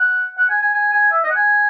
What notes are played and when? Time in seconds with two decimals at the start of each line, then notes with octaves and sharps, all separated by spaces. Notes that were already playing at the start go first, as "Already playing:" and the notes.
Already playing: F#5
0.37 F#5
0.49 G#5
0.62 G#5
0.74 G#5
0.93 G#5
1.11 E5
1.24 D#5
1.30 F#5
1.35 G#5